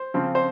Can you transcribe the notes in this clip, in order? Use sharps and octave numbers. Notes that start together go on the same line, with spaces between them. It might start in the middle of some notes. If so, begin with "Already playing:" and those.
Already playing: C5
C#3 F3 C4
C5